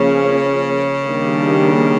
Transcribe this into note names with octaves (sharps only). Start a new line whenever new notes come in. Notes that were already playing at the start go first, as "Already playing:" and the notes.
Already playing: C#3 F3 A#3 C#4
D#3 G3 A#3 D4 G4